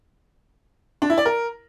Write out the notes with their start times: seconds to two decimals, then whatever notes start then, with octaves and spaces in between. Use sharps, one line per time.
1.02 D4
1.10 E4
1.18 D5
1.25 A#4